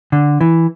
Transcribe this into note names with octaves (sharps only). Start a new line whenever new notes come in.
D3
E3